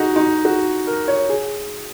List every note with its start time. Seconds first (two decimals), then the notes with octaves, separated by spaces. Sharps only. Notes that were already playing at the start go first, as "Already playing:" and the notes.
Already playing: D#4 F#4 G#4
0.16 D#4
0.45 F#4
0.87 A#4
1.08 C#5
1.29 G#4